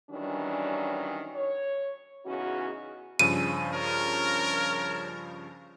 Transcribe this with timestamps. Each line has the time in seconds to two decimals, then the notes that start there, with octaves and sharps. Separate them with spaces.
0.11 D#3 E3 F#3 G3 C#4 D4
1.36 C#5
2.26 E2 C#3 C#4 D#4 F#4
3.19 G2 C#3 F3 C#4 E6 D#7
3.74 A#4 C#5 A5 F6